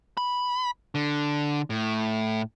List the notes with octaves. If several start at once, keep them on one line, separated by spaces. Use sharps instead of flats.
B5
D3
A2